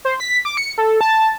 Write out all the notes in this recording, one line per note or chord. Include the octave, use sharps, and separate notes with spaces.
C5
B6
D6
C#7
A4
A5